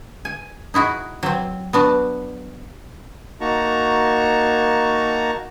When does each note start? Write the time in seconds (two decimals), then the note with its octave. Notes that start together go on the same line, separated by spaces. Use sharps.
0.25 G#5
0.74 D#4 E4 F#4 G#4
1.23 F#3 C4
1.73 B3 D4 F#4
3.41 A#3 D#4 F#4 A5 A#5 C#6